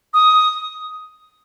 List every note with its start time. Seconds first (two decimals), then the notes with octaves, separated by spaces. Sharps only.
0.14 D#6